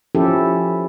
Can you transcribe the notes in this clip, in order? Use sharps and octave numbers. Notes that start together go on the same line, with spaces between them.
F3 C#4 E4 G4 A4